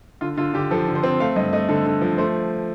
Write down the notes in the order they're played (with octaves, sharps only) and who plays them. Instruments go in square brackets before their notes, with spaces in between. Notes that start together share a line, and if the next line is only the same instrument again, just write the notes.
[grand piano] D3 F4
D3 F4
D3 G4
F3 A4
D3
C5
C4
A3 F5
G2 D#5
A3 D#5
D3 A4
D3
F3
A3 C5